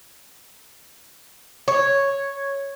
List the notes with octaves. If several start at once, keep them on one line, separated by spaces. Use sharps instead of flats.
C#5